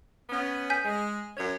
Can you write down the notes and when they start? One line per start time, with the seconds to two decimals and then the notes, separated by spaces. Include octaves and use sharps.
0.30 B3 C#4
0.70 G#5 G6 B6
0.85 G#3
1.37 F#2 C#5